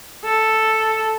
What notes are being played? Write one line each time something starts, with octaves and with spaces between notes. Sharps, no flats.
A4